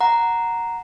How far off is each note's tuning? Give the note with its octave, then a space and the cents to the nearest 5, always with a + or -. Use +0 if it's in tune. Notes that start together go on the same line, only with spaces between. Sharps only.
F#5 +0 A#5 +0